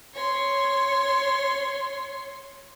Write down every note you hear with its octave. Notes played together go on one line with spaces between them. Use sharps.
C#5 C6